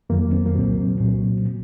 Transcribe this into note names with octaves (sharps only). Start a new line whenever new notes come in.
F2 D#3 F#3 A#3
C4
A#3
C2 A#2 F#3 C4
C2 A#2 F#3